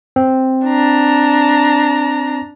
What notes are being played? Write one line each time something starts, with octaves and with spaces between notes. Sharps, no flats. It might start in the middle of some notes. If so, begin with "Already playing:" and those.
C4
D4 A#5